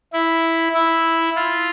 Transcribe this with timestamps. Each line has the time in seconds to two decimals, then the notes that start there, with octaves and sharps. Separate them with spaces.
0.13 E4
0.74 E4
1.36 F4